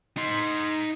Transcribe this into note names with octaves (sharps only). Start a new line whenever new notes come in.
D#4 C6